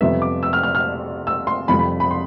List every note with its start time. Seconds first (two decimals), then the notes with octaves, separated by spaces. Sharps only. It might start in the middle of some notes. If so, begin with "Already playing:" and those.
0.01 F2 C3 G3 B3 E5
0.22 D6
0.43 E6
0.53 F6
0.63 F6
0.75 F6
1.27 E6
1.47 C6
1.68 F2 C3 G3 B5
1.79 B5
2.00 B5
2.11 C6